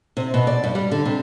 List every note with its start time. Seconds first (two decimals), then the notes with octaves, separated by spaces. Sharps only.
0.17 C3
0.34 B2
0.47 D5
0.64 G2
0.75 G3
0.92 D3
1.06 C3